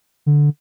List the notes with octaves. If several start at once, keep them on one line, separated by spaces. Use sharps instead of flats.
D3